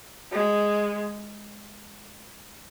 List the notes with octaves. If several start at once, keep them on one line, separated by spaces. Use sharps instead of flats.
G#3